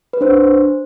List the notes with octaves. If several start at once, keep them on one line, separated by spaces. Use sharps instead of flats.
B4
D4 C5